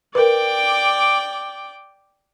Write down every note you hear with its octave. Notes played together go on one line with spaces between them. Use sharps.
A#4 B4 D5 G5 D6